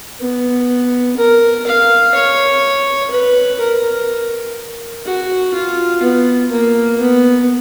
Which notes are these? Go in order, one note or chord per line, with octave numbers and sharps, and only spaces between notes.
B3
A#4
F5
C#5
B4
A#4
F#4
F4
B3
A#3
B3